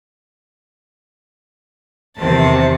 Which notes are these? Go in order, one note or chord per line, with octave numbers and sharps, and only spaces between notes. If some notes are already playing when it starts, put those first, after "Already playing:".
E2 C3 D#3 C4 A5